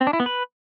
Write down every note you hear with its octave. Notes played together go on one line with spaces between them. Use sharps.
C4
D4
E4
B3
B4